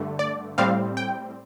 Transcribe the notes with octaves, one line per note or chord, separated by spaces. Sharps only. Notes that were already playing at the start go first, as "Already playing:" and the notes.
Already playing: G2 D3 A3
D5
A2 G3 C4 F5
G5